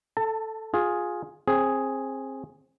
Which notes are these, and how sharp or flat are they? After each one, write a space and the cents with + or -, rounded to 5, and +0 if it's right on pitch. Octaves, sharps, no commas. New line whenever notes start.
A4 +0 A5 +30
F4 +20 G#4 +0
C4 +25 G#4 +0